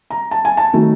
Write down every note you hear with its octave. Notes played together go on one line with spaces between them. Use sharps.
A#5
A5
G#5
A5
D#3 F#3 A3